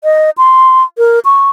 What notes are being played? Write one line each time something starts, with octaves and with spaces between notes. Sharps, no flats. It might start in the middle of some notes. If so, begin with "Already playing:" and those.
D#5
C6
A#4
C#6